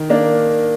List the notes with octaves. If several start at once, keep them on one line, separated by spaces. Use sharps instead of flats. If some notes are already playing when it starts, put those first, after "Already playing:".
Already playing: D#3
A#3 D4